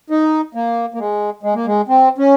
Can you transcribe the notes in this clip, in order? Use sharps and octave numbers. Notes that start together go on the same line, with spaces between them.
D#4
A#3
A#3
G#3
G#3
A#3
G#3
C4
C#4